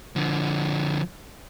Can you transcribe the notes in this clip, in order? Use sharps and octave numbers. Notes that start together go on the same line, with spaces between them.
D3 F3